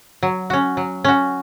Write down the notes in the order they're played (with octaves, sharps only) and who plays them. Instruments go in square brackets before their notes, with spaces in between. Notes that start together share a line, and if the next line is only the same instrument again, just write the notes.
[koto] F#3
C#4 F#4
F#3
C#4 F#4